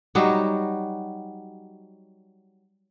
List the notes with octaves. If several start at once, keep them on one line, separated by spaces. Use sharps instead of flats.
F#3 G3 D#4 F#4